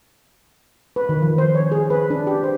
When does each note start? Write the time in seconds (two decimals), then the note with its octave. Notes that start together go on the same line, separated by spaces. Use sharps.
0.96 B4
1.09 D#3
1.22 F3
1.38 C5
1.55 C#5
1.72 G#4
1.90 B4
2.10 D4
2.27 G4
2.43 C5